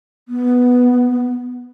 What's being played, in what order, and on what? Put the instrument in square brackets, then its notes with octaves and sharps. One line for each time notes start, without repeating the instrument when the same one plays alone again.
[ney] B3